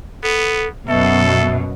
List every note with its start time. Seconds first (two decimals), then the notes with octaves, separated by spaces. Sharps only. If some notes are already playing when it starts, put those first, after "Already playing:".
0.23 B3 A4
0.88 F#2 B2 A4 E5